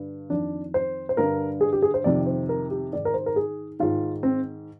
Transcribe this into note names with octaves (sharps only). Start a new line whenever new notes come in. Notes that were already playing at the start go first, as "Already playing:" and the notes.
Already playing: G2 D3
F2 D#3 D4
C5
C5
G2 D3 A#4
G#4
G4
G#4
C5
F2 C3 D#3 D5
C5
A#4
G4
G#2 D#3 D5
A#4
C5
A#4
G#4
G#2 D#3 F4
C4